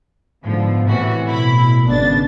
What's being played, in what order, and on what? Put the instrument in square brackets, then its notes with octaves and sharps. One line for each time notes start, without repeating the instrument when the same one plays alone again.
[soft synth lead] G#2 [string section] D3 F3 [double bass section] B3
[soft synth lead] A2 [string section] C3 E3 F#4
[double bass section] B2 [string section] E4 B5
[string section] G#1 D4 A6 [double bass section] C#3 B3